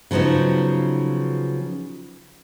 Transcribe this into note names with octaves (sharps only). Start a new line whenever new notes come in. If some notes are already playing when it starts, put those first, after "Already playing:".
C#3 F3 F#3 B3 D#4